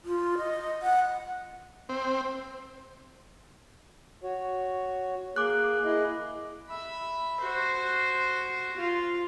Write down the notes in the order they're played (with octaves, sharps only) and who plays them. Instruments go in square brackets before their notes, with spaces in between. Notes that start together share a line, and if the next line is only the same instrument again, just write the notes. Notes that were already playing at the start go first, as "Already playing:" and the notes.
[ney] F4
D#5
F#5
[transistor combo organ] C4
[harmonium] F#4 C#5
[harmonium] A#3 G#4 [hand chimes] D6 F#6
[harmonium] E4 G#4 D#5
[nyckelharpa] E5 B5
F#4 C5
F4